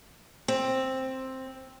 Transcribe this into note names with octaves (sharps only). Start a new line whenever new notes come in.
C4